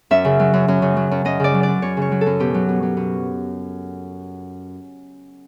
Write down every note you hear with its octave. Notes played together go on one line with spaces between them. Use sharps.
F#2 E5
C#3
F#3
F#2
F#2
C#3
F#3
F#2
F#2 D#5
C#3 D5
F#3
F#2 D5
F#2 C#5
C#3 C#5
F#3
A4
F#2
B2 G4
F#3
B2
F#3
B2